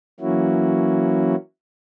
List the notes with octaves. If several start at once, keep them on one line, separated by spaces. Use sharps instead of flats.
E3 F#3 A#3 C#4 E4 F#4